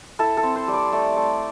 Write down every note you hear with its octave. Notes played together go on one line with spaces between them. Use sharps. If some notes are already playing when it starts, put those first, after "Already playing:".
E4 A4
A4
C4
C5
G3
D5
A3 D5
A3